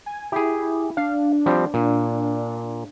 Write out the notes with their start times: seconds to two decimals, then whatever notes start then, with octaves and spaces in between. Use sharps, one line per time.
0.06 G#5
0.32 E4 G4 G#4
0.97 D4 F5
1.46 F3 G3 C4
1.74 A#2